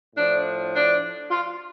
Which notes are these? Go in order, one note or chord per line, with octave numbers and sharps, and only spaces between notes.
A2 F3 D4
D4
F4